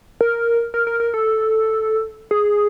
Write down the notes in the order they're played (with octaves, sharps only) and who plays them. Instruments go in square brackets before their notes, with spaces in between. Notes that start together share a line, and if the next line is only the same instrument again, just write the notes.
[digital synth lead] A#4
A#4
A#4
A#4
A4
G#4